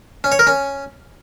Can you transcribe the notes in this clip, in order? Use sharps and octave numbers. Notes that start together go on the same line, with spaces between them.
C#4
C#5
A#4
C#4